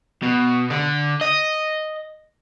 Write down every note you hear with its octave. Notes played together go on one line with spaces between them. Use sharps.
B2
D3
D#5